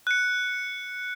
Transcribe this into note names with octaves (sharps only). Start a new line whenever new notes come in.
F#6 C#7